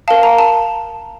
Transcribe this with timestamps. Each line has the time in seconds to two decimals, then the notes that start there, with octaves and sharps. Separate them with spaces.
0.08 A#4 F5 A5
0.23 A#5
0.38 A5